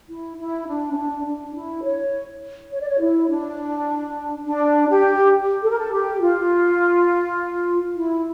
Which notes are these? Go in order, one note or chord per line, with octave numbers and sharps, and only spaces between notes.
E4
E4
D4
C#4
D4
D4
E4
C#5
C#5
D5
C#5
E4
D4
D4
G4
A4
A#4
A4
G4
F4
E4